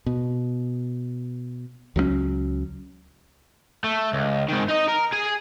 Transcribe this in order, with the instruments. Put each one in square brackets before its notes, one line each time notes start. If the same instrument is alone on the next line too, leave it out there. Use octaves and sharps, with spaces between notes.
[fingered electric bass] B2
C#2 F#3 A3 C#4
[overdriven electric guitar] A3
C#2
G#2 D#3
D#4 D#5
A#4
G#4 G#5